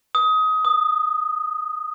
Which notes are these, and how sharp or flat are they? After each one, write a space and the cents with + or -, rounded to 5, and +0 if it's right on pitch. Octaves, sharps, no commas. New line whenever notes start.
D#6 +20
D#6 -15